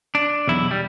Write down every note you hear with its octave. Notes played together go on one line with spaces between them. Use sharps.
D4
B1 E2 E4
G3